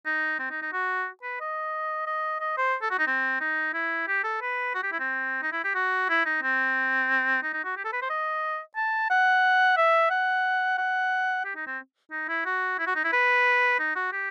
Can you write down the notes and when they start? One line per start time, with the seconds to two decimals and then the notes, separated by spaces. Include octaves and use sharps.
0.06 D#4
0.39 C4
0.50 D#4
0.62 D#4
0.72 F#4
1.23 B4
1.40 D#5
2.07 D#5
2.40 D#5
2.57 C5
2.82 A4
2.91 F#4
2.99 D#4
3.07 C4
3.41 D#4
3.74 E4
4.08 G4
4.24 A4
4.41 B4
4.74 F#4
4.83 G4
4.92 E4
4.99 C4
5.42 D#4
5.52 E4
5.64 G4
5.75 F#4
6.09 E4
6.25 D#4
6.42 C4
7.43 D#4
7.53 D#4
7.64 F#4
7.76 G4
7.84 A4
7.93 B4
8.02 C5
8.10 D#5
8.76 A5
9.10 F#5
9.77 E5
10.10 F#5
10.78 F#5
11.45 G4
11.56 D#4
11.67 C4
12.11 D#4
12.29 E4
12.45 F#4
12.79 E4
12.87 F#4
12.96 D#4
13.04 E4
13.12 B4
13.79 D#4
13.95 F#4
14.12 G4